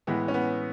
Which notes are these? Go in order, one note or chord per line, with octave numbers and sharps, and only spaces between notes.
A2 E3 G#3 B3
C#4
B3